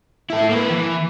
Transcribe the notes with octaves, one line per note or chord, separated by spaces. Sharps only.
E4 A4
A#3 B4
E3